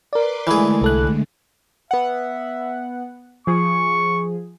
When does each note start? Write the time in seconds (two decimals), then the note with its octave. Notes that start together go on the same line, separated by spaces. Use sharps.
0.13 A#4 B4 D5 C6 D6
0.47 D3 E3 G#3 A3 G#4
0.82 C2 A4 F#6
1.91 B3 E5 F#5
3.47 F3 G#4 C#6